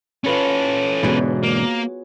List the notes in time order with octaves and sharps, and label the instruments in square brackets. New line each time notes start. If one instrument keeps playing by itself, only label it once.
[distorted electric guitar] C#4 A4 [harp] F4 B4 C#5
[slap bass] E1 G#2 D3 [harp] B3 F#4 G#4
[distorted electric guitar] A#3